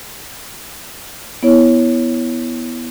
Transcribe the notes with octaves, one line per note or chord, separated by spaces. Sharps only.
B3 E4 C#5